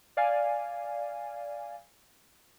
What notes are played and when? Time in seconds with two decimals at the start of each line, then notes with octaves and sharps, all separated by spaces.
0.17 D5 F5 G#5